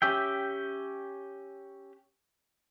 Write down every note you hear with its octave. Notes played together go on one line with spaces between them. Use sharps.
C#4 G4 E5 G5